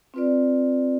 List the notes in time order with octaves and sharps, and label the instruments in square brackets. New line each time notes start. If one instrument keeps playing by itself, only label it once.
[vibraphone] C4 F4 B4 D5